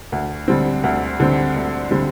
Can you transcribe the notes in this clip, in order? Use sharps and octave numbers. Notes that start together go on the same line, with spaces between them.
D2
D3 G3 C4
D2
D3 G3 C4
D2
D3 G3 C4